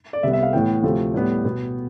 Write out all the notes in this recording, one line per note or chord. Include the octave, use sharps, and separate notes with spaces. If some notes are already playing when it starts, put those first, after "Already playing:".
D5
C2 C3 G3 B3 E5
E5
F5
A2 E3 B3 G5
D2 C3 F3 A3
A2 G3 B3
B2 B3